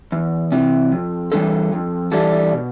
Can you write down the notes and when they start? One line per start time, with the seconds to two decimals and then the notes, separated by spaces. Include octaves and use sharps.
0.12 E2
0.52 C3 E3
0.92 F2
1.32 E3 G3 D4 A4
1.72 F2
2.12 E3 G3 D4 A4
2.52 B2